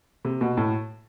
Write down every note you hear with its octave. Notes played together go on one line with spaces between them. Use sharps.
C3
B2
A2